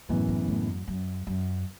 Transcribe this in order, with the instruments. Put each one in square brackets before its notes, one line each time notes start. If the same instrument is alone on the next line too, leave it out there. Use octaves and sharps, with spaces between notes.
[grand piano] F#1 F#2 E3 B3 [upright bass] A2
[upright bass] A2
A2
F#2
F#2
F#2